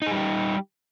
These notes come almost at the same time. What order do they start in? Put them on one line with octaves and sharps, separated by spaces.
D#4 G#4 G3 G4